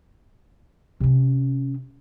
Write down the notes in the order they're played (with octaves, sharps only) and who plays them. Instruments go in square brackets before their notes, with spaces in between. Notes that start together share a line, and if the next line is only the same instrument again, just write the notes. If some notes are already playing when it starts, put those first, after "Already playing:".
[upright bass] C3 C#4